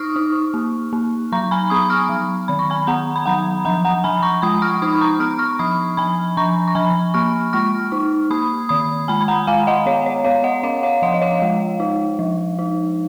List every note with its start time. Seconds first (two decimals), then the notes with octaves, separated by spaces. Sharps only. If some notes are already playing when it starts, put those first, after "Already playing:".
Already playing: D#4 C#6 D#6 F6
0.16 D#4
0.54 A#3
0.93 A#3
1.32 F#3 A#5 C#6
1.51 G#5 B5
1.70 B3 B5 D#6
1.90 C#6 F6
2.09 F#3
2.48 D#3 B5
2.59 C#6
2.70 G#5 B5
2.87 B3 F#5 A#5
3.16 B5
3.26 F#3 F#5 A#5
3.65 F3 F#5 A#5
3.85 F#5 A#5
4.04 F3 G#5 B5
4.23 A#5 C#6
4.42 G#3 B5 D#6
4.62 C#6 F6
4.82 D#4 B5 D#6
5.01 A#5 C#6
5.20 B3 F6
5.39 C#6 F6
5.59 F3 B5 D#6
5.97 F3 G#5 B5
6.37 F3 A#5 C#6
6.68 C#6
6.75 F3 G#5 B5
7.14 A#3 C#6 F6
7.53 G#3 C#6 F6
7.92 D#4
8.30 A#3 B5 D#6
8.69 D#3 B5 D#6
9.08 G#3 G#5 B5
9.21 B5
9.28 F#5 A#5
9.47 G#3 F5 G#5
9.67 D#5 F#5
9.86 B3 C#5 F5
10.06 C#5
10.24 B3 C#5 F5
10.44 D#5 F#5
10.63 C#4 C#5 F5
10.83 C#5 F5
11.02 F3 D#5 F#5
11.14 D#5
11.22 C#5 F5
11.42 G#3
11.80 D#4
12.19 F3
12.59 D#4